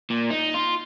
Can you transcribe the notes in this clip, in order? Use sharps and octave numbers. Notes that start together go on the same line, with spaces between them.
A#2
D#4
F4